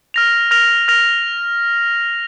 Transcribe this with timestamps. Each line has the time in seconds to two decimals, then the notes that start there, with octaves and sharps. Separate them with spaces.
0.14 F6 A#6 F7
0.51 F6 A#6 F7
0.88 F6 A#6 F7